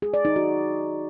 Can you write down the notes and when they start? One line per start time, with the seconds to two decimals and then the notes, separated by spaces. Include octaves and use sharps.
0.02 G#4
0.14 D5
0.25 D#4
0.36 F#4